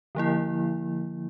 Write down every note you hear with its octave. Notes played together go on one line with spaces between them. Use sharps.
D3 F3 A#3 E4